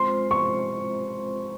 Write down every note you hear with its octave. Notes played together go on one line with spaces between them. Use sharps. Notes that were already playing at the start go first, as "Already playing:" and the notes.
Already playing: G#3 C4 F4 C5 C6
C#6